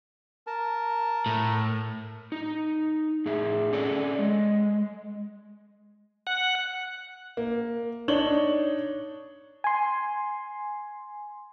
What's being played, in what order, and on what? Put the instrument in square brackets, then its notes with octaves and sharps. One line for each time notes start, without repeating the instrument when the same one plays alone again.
[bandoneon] A#4 A5
[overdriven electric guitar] A2
[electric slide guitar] D#4
A2 G#4 E5
C#4 A4 C#5 D5
G#3
[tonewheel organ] F#5
[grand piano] A#3
D4 D#4 C#5 F#7 G7
[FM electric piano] G#5 C6